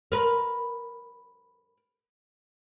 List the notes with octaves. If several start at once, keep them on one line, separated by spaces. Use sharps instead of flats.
A#4 B4